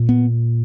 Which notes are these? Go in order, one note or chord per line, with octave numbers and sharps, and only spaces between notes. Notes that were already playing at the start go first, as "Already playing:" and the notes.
Already playing: A#2
B3